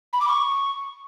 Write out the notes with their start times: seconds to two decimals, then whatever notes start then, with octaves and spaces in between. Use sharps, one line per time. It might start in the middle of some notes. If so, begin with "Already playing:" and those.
0.13 B5
0.20 D6
0.28 C#6